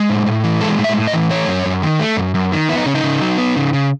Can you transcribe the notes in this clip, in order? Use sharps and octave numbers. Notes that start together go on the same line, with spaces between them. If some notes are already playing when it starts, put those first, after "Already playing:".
Already playing: G#3
A2
A2
E3
G#3 A4
A2
E5
A2
D#5
E3
A3 C#5
F#2
F#2
D#3
A3
F#2
F#2
D#3
B3 E4
D#4
C#3 C#4
D#4
C#3
F#3
B3
C#3
C#3